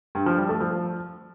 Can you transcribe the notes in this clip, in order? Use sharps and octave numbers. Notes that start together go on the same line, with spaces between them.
G2
F3
G3
A3
F3